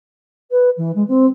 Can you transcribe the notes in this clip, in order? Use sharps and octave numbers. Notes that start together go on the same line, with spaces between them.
B4
E3
G#3
C4